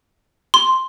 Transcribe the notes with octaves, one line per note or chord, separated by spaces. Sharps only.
C6